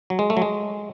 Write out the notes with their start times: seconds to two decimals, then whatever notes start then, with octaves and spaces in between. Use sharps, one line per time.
0.10 F#3
0.19 G#3
0.30 A3
0.37 F#3
0.42 G#3